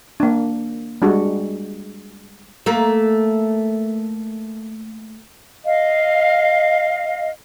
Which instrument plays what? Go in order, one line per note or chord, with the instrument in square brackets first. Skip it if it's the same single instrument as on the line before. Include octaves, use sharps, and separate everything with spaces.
[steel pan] A#3 D4
G3 G#3 D4 F#4
[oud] A3 A#3
[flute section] D#5 F5